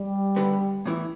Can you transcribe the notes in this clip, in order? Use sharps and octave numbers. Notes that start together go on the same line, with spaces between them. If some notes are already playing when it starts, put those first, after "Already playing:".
Already playing: G3
D3 B3 G4 B4
A2 E3 B3 E4